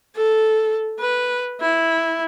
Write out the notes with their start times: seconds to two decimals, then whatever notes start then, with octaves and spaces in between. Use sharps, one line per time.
0.16 A4
1.00 B4
1.60 E4